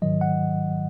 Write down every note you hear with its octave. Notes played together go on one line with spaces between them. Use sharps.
G#2 D#3 F#3 D#5
F#5